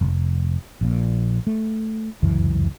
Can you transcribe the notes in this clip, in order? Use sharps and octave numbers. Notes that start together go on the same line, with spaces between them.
F1
A#1 A#2
A3
F1 C#2 F#2 E3